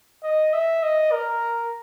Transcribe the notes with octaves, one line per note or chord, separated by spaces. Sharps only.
D#5
E5
D#5
A#4